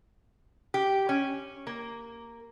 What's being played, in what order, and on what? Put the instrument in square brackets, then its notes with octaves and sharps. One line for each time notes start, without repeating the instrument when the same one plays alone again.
[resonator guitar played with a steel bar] G4
C#4
A#3